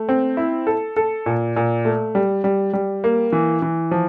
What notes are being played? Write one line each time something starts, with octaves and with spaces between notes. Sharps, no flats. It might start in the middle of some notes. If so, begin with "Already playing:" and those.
Already playing: A3
C4
E4
A4
A4
A#2
A#2
A3
G3
G3
G3
A#3
E3
E3
F3